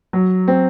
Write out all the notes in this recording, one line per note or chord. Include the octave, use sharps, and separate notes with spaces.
F#3
C4